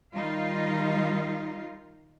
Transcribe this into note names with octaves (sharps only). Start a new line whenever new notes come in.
D#3 G3 D#4 F4 F5